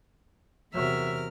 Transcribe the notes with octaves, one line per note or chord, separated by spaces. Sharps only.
E2 C3 F#3 A#4 E5 F6